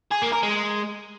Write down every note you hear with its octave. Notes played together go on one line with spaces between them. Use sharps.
G#4
A#3
A#4
G#3